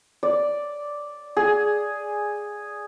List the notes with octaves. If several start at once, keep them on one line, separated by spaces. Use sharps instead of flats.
D5
G#4